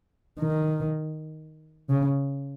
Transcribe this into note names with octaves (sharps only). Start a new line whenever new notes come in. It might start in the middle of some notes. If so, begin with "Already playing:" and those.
D#3
C#3